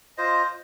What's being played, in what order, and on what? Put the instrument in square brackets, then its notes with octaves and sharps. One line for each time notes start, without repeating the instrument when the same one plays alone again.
[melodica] F4 C5 D#5